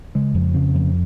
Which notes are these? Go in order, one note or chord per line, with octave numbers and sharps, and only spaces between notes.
C#3 G#3
F2
C#3 C4
F2